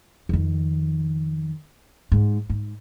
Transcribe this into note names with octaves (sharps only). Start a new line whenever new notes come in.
F2 D#3
G#2
G#2